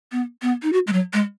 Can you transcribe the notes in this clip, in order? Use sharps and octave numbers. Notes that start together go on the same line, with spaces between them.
B3
B3
D#4
F#4
G#3
F#3
G#3